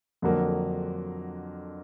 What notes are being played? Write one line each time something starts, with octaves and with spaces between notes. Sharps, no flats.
F2 D3 F#3 A#3